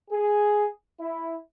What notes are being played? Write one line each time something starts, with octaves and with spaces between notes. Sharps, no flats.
G#4
E4